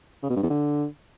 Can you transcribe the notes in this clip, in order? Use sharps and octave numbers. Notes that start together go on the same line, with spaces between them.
C#3
B2
G2
E2
D3